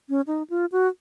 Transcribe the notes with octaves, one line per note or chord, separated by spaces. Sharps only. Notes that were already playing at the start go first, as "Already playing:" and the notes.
C#4
D#4
F4
F#4